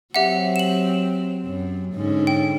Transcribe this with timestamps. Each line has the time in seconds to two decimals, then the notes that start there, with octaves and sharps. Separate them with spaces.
0.14 F#3 C4 G4 E5 F#5
0.56 E7 F#7
1.45 F#2
1.94 G#2 D3 C#4
2.27 G5